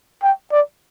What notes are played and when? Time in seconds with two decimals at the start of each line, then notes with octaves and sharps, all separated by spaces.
0.23 G5
0.52 D5